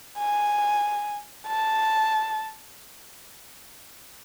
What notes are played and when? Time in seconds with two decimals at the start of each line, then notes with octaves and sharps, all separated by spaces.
0.19 G#5
1.47 A5